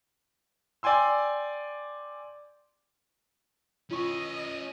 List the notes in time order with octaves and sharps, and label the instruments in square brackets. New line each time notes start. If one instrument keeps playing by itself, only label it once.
[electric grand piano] D5 G5 G#5 C6 E6
[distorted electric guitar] C#4 B4 [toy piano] F4 C#6 [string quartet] D#5